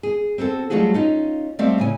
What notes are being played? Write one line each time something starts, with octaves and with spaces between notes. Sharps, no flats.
G#4
C4 F#4 G#4 A4
F#3 G3 A3 F4 F#4 G#4
C#4 D#4 F4
G3 A3 C4 D5 E5 F5
A2 C#3 G#5